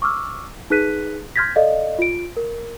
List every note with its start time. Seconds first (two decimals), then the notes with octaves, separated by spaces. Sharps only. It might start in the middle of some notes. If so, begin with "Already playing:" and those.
0.02 C#6 D6 E6 F6
0.70 D#4 G#4 B4 F#6 B6 D#7
1.36 C6 F6 G6 G#6 A#6 B6
1.56 A4 D5 D#5 F5
1.99 F4 D7
2.37 A#4